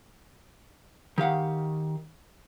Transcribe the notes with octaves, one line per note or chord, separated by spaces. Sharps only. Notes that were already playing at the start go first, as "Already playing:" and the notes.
D#3 G4 F5 F#5